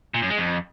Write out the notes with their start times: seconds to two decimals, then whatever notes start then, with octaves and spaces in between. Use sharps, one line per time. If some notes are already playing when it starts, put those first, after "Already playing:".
0.14 A#2
0.22 F#2
0.30 G#3
0.38 F2